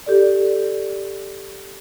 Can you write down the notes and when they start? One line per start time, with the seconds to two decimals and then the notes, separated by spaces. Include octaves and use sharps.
0.06 G4 A4 D5